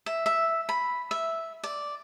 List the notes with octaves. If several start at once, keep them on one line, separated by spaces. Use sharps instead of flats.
E5
E5
B5
E5
D5